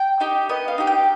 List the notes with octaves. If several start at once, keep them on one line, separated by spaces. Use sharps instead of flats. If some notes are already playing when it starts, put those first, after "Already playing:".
Already playing: G5
D#4 G4
B3 D#5
F5
D#4 G4
G5